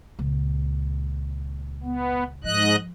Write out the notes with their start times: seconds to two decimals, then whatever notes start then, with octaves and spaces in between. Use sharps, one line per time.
0.19 C#2 A#2
1.83 B3
2.44 G#2 F3 D#5 F#6